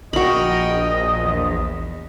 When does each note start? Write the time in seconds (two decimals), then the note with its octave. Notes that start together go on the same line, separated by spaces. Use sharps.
0.13 A#1 F#4 A#4 D#5 G5 B5
1.21 E2